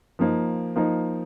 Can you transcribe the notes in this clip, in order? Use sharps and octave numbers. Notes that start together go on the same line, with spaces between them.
F3 A#3 D#4
F3 A#3 D#4